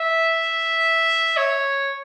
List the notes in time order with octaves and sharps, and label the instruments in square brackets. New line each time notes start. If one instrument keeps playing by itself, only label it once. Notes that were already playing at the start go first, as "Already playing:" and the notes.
Already playing: [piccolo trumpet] E5
C#5